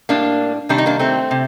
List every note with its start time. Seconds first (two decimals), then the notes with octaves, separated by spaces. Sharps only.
0.09 A2 G3 A#3 D4
0.69 C3 D#3 G3 D4
0.78 D#4
0.86 A#3 D4
0.99 A3 C4
1.31 C3